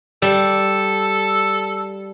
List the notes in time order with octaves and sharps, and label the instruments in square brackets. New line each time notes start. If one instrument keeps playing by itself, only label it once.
[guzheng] G3 [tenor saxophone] A4